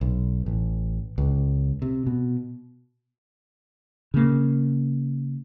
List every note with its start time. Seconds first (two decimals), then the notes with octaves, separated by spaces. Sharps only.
0.01 B1
0.46 A1
1.18 C#2
1.82 C3
2.07 B2
4.14 C#3 A#3